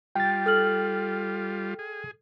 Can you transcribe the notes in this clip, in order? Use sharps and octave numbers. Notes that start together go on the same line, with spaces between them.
G3 F4 G5 A6
A4 F6 F#7
G#4